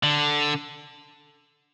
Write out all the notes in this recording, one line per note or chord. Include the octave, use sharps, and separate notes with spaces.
D3